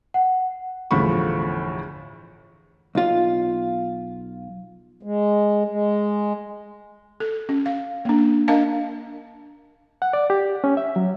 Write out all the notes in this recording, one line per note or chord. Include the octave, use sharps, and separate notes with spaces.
F#5
G1 E2 A2 F3 B5 C#6
B1 F4
G#3
G#3
A4
C#4
F5
A#3 D4
D4 A#4 D#5 F5 A5
F#5
D5
G4
C#4
E5
F#3